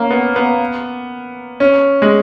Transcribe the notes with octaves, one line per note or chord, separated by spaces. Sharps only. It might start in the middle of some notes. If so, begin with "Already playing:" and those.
Already playing: A#3 C#4
B3
B3
C#4
G#3